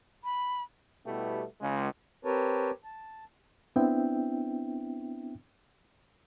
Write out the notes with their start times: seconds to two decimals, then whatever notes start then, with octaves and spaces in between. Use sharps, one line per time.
0.24 B5
1.06 B2 G3 A3 B3 E4 G4
1.61 C#2 G#3
2.25 C4 G4 A#4 B4 C#5 A5
2.84 A5
3.76 B3 C4 D4 E4 E5 G5